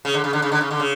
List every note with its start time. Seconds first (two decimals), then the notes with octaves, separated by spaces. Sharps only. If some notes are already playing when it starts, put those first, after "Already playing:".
0.05 C#3
0.14 D3
0.24 C#3
0.33 D3
0.42 C#3
0.52 D3
0.61 C#3
0.71 D3
0.80 C#3